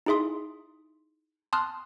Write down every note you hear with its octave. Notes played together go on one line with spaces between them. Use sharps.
D#4 E4 G#4 E5 C6 D#6
A5 C6 D#6 F6 F#6